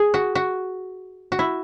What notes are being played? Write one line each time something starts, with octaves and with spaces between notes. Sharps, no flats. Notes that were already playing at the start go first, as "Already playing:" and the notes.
Already playing: G#4
F#4
F#4
F#4
E4